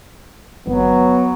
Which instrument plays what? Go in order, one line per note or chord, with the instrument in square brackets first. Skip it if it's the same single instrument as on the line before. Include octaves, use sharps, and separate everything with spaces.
[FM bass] G1 [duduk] F#3 [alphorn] B3